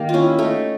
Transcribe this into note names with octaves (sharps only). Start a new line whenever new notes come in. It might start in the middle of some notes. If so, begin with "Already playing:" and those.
Already playing: D#3 A#3 G4
F4
C#4 E4
A3 D#4